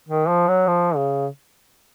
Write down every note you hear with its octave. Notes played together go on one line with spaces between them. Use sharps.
D#3
F3
F#3
F3
C#3